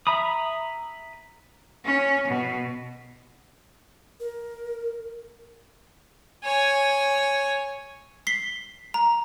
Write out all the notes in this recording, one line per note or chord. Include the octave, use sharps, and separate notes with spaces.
E5 A#5 B5 D#6
C#4
B2
A#4
C#5 G#5
B6 C7 G7
A#5